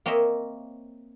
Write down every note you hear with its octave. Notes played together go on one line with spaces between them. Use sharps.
A#3 C4 C#5 D#5 E5